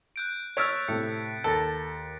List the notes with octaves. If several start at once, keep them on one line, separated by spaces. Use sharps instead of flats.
F#6 G6 D7
C#5 E6 F6 A6 B6 D7
A2 C3 C#7
D#2 A4 A6 A#6